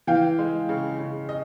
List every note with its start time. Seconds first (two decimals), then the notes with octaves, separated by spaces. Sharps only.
0.07 E3 F5 G5
0.39 G#3
0.69 C#3
0.99 C#3
1.29 D#5